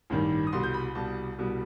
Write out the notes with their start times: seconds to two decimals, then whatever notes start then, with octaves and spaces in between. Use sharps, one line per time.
0.10 A1 G2 D#3 G3
0.47 D#6
0.52 C2 B2 G3 C6
0.63 G6
0.74 B5
0.95 C2 B2 G3 A5
1.38 C2 B2 G3